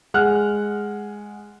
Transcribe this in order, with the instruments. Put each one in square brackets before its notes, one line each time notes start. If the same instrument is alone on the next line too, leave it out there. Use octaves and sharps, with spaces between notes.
[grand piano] G#3 F#5 F6 F#6